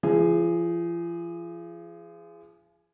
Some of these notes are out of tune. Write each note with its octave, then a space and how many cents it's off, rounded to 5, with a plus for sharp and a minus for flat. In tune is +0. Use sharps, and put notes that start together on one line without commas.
F3 -40 G#4 +0